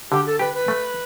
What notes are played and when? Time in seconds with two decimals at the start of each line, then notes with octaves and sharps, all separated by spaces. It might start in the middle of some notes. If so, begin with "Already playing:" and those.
0.11 D3 G4
0.26 A4
0.39 G4 B4
0.54 B4
0.68 A3